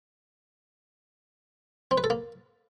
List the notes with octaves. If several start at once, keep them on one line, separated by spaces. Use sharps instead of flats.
C4
B4
A4
A#3